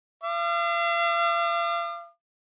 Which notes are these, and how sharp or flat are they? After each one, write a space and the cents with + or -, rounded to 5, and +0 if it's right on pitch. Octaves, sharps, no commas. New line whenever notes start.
F5 -40 D6 +40